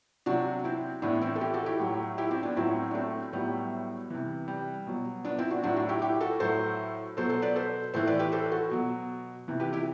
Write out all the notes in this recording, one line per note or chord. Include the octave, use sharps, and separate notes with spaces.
C3 F#3 D4 F#4
C4 E4
A2 E3 B3 D4
C4 E4
A4
E4 G4
F#4 A4
E4 G4
A2 F#3
E4 G4
C4 E4
B3 D4
A2 F#3 C4 E4
D4
A3 C4
A2 F#3 G3 B3
C3 E3
G3
B2 F#3
B3 D4
C4 E4
D4 F#4
A2 F#3 D4 F#4
D4 F#4
E4 G4
E4 G4
F#4 A4
A2 F#3 A4 C5
B2 F#3 A4 C5
A4 C5
B4 D5
A4 C5
A2 E3 A4 C5
B4 D5
G4 B4
A4 C5
F#4 A4
B2 F#3
C3 E3
G4 B4
E4 G4